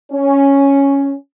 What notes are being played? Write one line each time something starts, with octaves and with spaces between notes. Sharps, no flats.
C#4